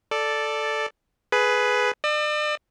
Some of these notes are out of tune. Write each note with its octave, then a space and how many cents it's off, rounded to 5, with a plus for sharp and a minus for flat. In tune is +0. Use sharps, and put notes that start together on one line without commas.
A4 +0 D5 +0
G#4 +15 B4 +5
D5 +40 E6 -10